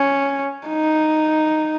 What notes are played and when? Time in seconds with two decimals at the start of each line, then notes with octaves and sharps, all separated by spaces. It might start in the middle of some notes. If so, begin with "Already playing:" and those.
Already playing: C#4
0.67 D#4